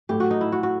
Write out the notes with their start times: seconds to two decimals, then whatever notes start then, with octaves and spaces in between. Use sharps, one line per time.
0.09 A2 F#3 A3 G4
0.20 F#4
0.31 D#4
0.41 E4
0.52 F#4
0.63 F#4